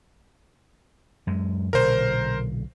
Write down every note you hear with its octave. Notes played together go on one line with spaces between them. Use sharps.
F#2 G#3
B1 A#2 D3 A#4 C5